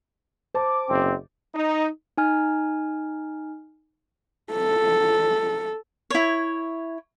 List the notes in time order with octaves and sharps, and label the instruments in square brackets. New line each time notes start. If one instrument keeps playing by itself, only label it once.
[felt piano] C5 A5 [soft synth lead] D6
[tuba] F#1 [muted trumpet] C4
[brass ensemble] D#4
[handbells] D#4 G#5 F6
[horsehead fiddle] A4
[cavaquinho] E4 C#5